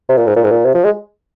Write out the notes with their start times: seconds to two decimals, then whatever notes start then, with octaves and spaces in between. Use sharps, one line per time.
0.09 C3
0.17 A#2
0.27 G#2
0.36 A#2
0.44 G#2
0.51 A#2
0.65 C3
0.75 F3
0.85 G#3